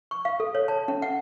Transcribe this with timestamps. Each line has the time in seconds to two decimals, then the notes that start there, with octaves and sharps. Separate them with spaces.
0.11 C#6
0.25 F5
0.40 A4
0.55 C#5
0.68 A5
0.88 C#4
1.02 F#5